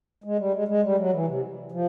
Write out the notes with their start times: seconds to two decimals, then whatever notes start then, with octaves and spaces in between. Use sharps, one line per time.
0.24 G#3
0.39 G3
0.54 G#3
0.68 G#3
0.83 G3
0.98 F#3
1.13 E3
1.28 C3
1.72 F3